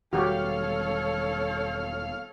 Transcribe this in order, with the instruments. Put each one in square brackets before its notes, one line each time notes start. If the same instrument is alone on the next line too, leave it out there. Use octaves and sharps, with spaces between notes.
[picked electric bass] E1 D#3 G3 [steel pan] F#4 G4 [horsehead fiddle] A4 C#5 [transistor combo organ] F5